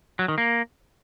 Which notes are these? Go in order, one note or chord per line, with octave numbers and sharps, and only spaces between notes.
F#3
D#3
A#3